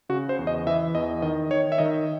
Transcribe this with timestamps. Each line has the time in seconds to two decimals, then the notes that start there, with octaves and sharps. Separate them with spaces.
0.09 C#3 F#4
0.29 C5
0.39 E2
0.47 D#5
0.67 E3 E5
0.95 E2 D#5
1.22 D#3 D#5
1.50 D#3 C#5
1.72 E5
1.78 D#3 D#5